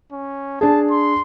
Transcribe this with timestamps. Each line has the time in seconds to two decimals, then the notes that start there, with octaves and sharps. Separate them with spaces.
0.12 C#4
0.61 D4 G#4 A5
0.91 C6